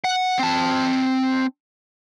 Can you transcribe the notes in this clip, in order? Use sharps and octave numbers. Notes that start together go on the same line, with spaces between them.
F#5
C4 A5